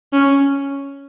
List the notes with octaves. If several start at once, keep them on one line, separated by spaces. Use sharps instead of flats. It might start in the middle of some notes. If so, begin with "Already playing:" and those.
C#4